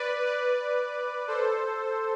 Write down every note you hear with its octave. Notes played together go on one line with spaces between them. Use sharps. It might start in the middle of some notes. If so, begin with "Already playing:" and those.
Already playing: B4 D5
B4 D5
A4 C5